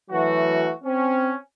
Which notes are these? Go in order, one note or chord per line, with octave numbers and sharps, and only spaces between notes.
E3 F#3 A3 F#4
C4 C#4